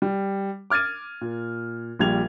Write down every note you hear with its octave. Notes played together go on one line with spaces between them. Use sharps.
G3
D6 F6 G#6 A6 D#7
A#2
A#1 A#2 G3 G#6 F7